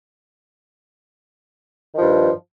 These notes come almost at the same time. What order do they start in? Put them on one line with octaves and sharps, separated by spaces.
D#3 F3 G2